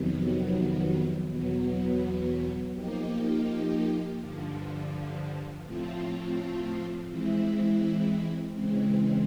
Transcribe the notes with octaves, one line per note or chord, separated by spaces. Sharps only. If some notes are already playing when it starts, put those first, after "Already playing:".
Already playing: F2 C3 D#3 F#3 B3
E2 B2 F#3 B3
F3 A#3 D#4 G4
G2 D3 F3
A2 F3 A3 C4 F4
E3 G#3 C4 E4
C#3 E3 G#3 C4